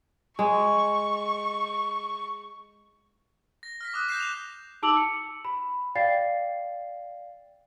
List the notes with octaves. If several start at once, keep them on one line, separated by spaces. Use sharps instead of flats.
G#3 C#6
A#6
F6 A#6 B6
D6 D#6 F#6
G6 A#6 C7 E7
F7
D#4 A5 D6 E6 F7 F#7
C#7
B5
D5 F5 G5 A6 C7